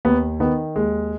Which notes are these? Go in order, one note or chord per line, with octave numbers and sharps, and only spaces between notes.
D#2 B3
D#3 B3
D#2 G#3